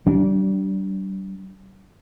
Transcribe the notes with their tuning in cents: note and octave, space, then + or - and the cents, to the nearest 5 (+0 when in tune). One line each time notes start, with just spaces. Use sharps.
G3 -35 D4 -20